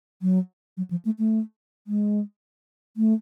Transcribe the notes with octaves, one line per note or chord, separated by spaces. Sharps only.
F#3
F#3
F3
A3
A3
G#3
A3